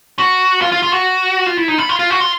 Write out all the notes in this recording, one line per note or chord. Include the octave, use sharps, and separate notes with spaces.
F#4
F4
F4
F4
F#4
F4
E4
D#4
E4
F4
F4
F#4
F4